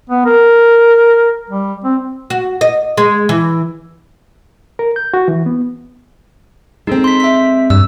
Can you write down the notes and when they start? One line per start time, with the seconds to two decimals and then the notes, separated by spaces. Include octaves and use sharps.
0.10 B3
0.26 A#4
1.50 G3
1.84 C4
2.30 F#4
2.61 D#5
2.97 G#3
3.29 E3
4.79 A#4
4.96 G6
5.14 F#4
5.28 E3
5.46 B3
6.87 G#3 C4 D#4 A4
7.04 C6 B6
7.20 E5 B6
7.70 G2 E6